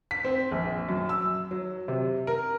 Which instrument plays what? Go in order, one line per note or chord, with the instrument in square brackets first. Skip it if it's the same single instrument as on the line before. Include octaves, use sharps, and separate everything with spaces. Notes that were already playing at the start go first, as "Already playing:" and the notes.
[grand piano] B6
C4
A#1
F#2
E6
F#3
C3
A#4